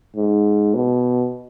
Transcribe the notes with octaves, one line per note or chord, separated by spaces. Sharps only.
G#2
B2